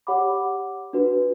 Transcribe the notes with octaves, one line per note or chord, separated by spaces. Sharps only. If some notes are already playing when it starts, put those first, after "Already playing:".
G4 C#5 F#5 B5 D6
D4 F#4 B4